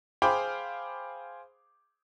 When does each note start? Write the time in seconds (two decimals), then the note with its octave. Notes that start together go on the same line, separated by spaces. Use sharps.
0.22 G#4 C5 F5 G5 B5 D6